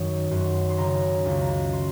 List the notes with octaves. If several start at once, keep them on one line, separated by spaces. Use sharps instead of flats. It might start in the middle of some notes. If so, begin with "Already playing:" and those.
Already playing: F#2 D#3 D#6
F#2 C6
C6
C6
C#3 A#5
C#2
A#5
C6